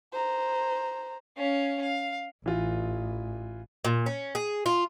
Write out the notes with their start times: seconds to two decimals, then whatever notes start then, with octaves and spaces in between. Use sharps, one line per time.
0.13 C5 A#5
1.37 C#4 F5
1.82 F5
2.46 A1 E3 F4
3.85 A#2
4.06 C#4
4.35 G#4
4.66 F4